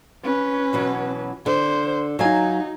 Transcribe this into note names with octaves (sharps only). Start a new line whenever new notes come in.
C#4 B4
B2 E3 F#3
D3 C5
F#3 D#4 F5 G#5